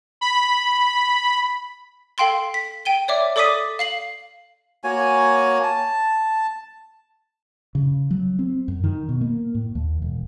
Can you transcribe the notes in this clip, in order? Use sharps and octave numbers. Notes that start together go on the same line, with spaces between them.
B5
A4 F5 G5 C6 G7
B6
G5 D#7 G7
C#5 D5 E5 D6
A4 D5 D6 D#6 B6 D#7
F5 C7 F#7
A#3 F#4 C#5 G#5
A5
C#3
F#3
C4
F#2
D#3
B2
A#3
A2
D#2
E1